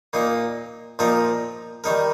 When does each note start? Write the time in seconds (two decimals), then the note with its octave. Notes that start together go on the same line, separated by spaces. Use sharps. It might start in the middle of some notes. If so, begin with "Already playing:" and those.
0.13 A#2 A#3 D#4
0.99 A#2 F3 D#4 A#4
1.84 D#3 G3 D#4 A#4